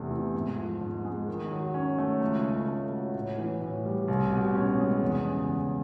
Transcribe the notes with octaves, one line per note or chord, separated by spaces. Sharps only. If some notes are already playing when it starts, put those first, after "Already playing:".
Already playing: E2 C3 A3
E3
G#2
F3
G#2
G#3
D#3
F#3
C#4
A3
C#2
C#3
A3
F#3
A2
E3
A2
G3
C2
B2
C#4
G#3
E2
C#3
E2